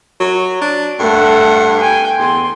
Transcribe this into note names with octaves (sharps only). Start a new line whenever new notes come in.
F#3
D4
G2 A3 F#5
G5 G#5
E2 C6